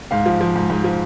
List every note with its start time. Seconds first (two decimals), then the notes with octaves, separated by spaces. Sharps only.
0.11 G#2 F5
0.26 F3
0.41 F3
0.56 G#2
0.70 G#2
0.84 F3